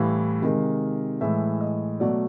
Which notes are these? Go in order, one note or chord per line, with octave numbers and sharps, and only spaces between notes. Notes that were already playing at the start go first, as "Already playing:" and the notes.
Already playing: A2 E3 G3 F5
C3 D#3 G#3
A2 E3 G#3 E5
D#5
B2 F#3 A3 D5